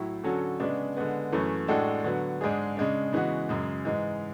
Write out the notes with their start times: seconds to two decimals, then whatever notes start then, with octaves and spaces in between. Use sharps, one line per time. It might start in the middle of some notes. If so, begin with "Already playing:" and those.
Already playing: A2 F#3 E4
0.24 D3 F#3 C#4 F#4 A4
0.60 C#3 G#3 B3 D4
0.96 D3 G#3 B3
1.32 F#2 E3 A3 C#4
1.68 A2 G#3 D4 F#4 A4
2.04 D3 F#3 B3
2.41 G#2 G#3 D4 G#4
2.77 C#3 G#3 D4
3.13 C#3 E3 G#3 B3 F#4
3.49 F#2 C#3 G#3
3.85 G#2 E3 G#3